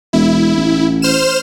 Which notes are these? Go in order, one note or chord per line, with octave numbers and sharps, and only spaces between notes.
E1 E4
A1
C5 F6 E7